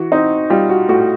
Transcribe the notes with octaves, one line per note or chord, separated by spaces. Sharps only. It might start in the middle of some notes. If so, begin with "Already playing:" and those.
Already playing: E3 F#4
C4 D#4
G3 F4
F#4
A2 F#4